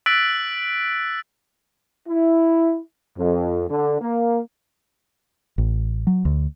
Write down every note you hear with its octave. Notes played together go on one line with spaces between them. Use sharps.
E6 F#6 A6 B6 D7 F#7
E4
F2
D3
A#3
A1
F#3
D2